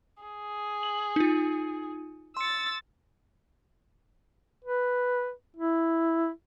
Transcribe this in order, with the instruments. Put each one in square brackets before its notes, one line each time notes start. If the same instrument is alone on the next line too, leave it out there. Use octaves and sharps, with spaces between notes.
[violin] G#4
[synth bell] F#7
D#4 F4
[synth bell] C6 C#7 [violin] E6 A6
[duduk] B4
E4